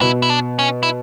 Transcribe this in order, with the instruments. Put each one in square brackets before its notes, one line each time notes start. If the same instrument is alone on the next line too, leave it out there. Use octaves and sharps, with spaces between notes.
[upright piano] B2 [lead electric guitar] E4
[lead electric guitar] E4
D4
C#4
E4